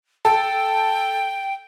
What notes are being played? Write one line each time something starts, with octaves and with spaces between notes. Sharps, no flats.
A4 G5